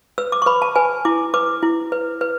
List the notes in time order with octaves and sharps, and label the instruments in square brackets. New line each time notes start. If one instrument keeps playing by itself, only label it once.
[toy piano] B4 E6
D6
C#6
B4 B5
A5
B4 G#5
E4 D6
B4 D6
E4
B4
B4